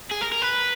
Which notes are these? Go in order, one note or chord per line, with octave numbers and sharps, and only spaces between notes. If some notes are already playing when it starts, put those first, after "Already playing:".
G#4
A#4
A#4
B4